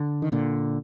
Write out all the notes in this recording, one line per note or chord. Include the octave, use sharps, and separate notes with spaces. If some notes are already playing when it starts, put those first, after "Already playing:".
Already playing: D3
D#3
A#2 D3